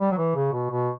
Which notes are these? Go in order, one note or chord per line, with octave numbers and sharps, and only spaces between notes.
G3
F#3
E3
C#3
B2
B2